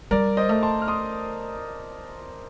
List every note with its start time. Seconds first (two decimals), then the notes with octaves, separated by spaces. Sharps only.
0.11 G3 A#4 D5
0.37 C5 D#5
0.49 A3
0.62 A5 C6
0.82 F6
0.88 C6 D#6